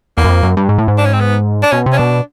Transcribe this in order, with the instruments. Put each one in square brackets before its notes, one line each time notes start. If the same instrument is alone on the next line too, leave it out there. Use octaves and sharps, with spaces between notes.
[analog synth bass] E2 [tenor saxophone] A#3
[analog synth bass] F#2
F2
F#2
G2
G#2
A2
G#2
[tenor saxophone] D4
C#4
C4
B3
D4
[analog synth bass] B2 [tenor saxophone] C#4
[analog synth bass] C3
[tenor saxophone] C#4
[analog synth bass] B2 [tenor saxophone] D4